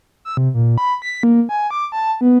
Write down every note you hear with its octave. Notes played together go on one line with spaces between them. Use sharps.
E6
C3
A#2
B5
B6
A#3
G#5
D6
A5
B3